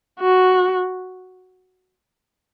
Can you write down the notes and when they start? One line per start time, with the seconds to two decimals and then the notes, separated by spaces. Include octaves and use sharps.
0.20 F#4